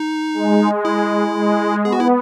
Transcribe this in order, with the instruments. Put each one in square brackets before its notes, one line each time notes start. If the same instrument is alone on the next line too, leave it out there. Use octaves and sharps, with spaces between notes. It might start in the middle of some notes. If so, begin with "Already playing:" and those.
Already playing: [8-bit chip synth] D#4
[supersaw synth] G#3
[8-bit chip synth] E4
[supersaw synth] G#3
[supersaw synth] B3 [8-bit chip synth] G#4
[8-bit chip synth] F#4
E4